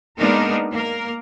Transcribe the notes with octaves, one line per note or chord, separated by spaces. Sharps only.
G#3 A#3 B3 D4 D#4 A#4
A#3 A#4